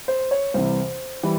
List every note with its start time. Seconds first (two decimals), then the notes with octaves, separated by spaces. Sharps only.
0.08 C5
0.31 C#5
0.54 C2 C3 E3 C5
1.23 E3 G3